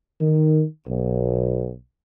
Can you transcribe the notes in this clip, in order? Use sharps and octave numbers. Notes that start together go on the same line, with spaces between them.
D#3
B1